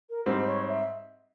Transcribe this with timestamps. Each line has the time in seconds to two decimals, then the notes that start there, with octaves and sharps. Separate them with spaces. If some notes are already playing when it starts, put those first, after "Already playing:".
0.10 A#4
0.26 G#2 G3 C4 C5
0.47 C#5
0.69 E5